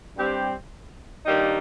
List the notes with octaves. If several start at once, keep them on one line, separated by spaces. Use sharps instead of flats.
G2 G3 C4 G4
G2 D#3 G3 A#3 D#4